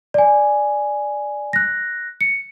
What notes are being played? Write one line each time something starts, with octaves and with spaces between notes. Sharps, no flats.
D5 G#5
F#6 A#6
C#7